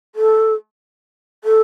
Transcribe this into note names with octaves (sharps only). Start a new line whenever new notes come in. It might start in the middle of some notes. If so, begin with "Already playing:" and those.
A4
A4